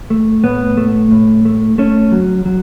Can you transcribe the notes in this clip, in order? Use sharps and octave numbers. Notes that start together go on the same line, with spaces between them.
A3
A2 B3
A3
A2
A3
A3 C#4
F#3
F#3